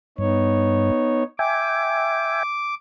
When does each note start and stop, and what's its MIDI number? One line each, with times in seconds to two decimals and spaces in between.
0.18 0.91 43
0.18 1.23 59
0.18 1.23 63
0.18 1.23 73
1.39 2.43 76
1.39 2.43 79
1.39 2.43 80
1.39 2.75 86